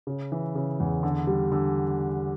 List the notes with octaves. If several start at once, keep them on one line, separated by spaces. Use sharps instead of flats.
C#3
E3
C#3
E2
D3
G3
D3